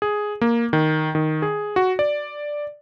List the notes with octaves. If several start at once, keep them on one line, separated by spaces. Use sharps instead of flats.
G#4
A#3
D#3
D#3
G#4
F#4
D5